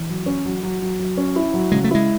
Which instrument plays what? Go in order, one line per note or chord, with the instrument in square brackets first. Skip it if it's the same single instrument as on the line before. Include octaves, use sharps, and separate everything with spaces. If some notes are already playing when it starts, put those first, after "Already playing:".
Already playing: [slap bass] E3
[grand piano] F#3
C#4
F#3
F#3
F#3
F#3
C#4
E4
F#3
[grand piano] C#3 [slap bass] G#3
[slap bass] A3
[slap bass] G#3 [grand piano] E4